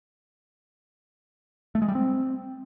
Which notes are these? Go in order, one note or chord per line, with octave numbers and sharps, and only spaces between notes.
A3
G#3
G3
C4